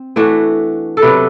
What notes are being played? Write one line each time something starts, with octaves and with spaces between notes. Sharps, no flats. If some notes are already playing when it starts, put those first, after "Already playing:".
Already playing: C4
E3 A3 D4 F#4
A4
C3 F#3 B3 B4